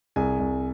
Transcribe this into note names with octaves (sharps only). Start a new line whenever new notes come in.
C2 G#4 G#5
C2